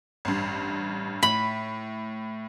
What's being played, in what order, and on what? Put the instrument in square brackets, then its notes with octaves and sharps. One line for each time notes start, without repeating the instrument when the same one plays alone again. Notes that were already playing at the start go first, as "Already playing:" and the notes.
[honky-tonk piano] A1 G2
[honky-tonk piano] A2 [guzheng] B5